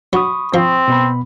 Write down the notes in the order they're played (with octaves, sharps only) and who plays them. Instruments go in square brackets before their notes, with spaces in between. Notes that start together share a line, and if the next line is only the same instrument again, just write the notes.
[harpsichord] F#3 [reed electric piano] B5 C#6 D#6
[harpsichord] F3 [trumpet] C4
[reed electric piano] B2 B3 B5